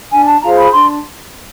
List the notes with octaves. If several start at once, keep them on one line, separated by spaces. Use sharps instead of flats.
D4 G#5
A5
F4 G#4 C5 A#5
B5
D4 C6